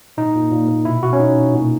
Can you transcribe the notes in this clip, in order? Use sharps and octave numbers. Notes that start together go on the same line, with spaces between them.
A#2 D#4
A#2
A#2
A#2
B2 E4
B2 F#4
C#4
B2 D#4
B2
A#2